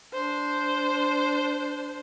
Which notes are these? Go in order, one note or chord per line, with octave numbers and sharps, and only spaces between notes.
D4 C5